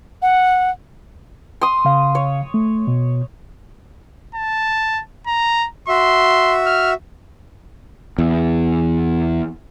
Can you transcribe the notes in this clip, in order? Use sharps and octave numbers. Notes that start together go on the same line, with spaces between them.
F#5
C6 D#6
C#3 F5
C#5
A3
B2
A5
A#5
F#4 E5 C6
F6
E2